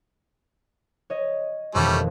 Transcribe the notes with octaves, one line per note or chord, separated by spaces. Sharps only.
C#5 D#5
E1 F2 D#3 G3 A3 C#4